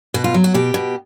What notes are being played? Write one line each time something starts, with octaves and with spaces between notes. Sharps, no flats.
B2 F#4
F4
F#3
F#4
B2 G4
B2